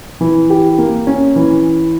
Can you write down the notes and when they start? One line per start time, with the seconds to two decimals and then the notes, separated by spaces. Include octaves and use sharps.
0.21 E3
0.50 G4
0.78 A#3
1.07 C#4
1.36 E3